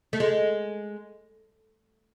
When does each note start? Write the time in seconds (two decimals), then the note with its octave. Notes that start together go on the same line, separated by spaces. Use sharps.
0.13 A3
0.20 G#3